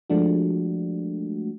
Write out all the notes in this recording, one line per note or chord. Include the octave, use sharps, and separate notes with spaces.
F3 G#3 A3 D4 F#4